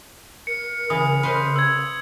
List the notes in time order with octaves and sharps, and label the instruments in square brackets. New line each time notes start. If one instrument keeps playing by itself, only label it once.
[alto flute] A#4 [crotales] C#7
[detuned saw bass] C#3 [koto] E3 [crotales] D#6
[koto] B4 C5 D#5
[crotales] E6 G#6